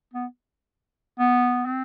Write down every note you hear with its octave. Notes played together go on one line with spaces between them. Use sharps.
B3
B3
C4